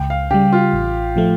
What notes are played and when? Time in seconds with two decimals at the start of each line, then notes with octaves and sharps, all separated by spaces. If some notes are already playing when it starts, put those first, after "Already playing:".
Already playing: C#2 G5
0.10 F5
0.31 C#3 G3 G4
0.53 F4
0.73 A1
1.16 A2 F3 A3